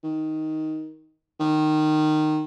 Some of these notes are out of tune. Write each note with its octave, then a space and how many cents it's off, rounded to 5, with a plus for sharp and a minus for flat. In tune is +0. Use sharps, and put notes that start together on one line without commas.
D#3 +10
D#3 -15